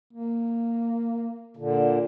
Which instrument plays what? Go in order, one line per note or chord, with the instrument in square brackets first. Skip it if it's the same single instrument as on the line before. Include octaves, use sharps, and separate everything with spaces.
[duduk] A#3
[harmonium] A#2 D3